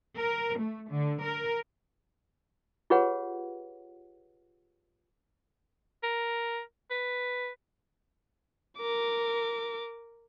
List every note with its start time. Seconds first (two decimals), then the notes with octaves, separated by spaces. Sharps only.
0.17 A#4
0.59 A3
0.89 D3
1.23 A#4
2.90 F4 G4 G#4 B4 C#5 F#5
6.03 A#4
6.90 B4
8.78 A#4 D6